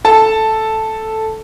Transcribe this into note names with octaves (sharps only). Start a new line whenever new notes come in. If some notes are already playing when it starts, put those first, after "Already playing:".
A4 A5